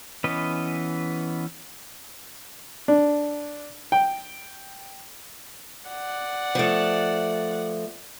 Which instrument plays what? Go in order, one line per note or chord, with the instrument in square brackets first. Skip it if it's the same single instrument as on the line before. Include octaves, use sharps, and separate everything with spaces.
[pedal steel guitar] E3 B3 C#4 B4 D#5
[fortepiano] D4
G5
[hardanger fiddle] D5 F#5
[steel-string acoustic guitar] F3 A3